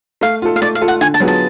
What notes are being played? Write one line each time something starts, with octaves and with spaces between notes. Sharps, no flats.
A3 F5
F4 A4
F5
A3 D5
F5
F4 A4
F#5
D3 G#5
A5
F#3 B3 F4 G#4
A5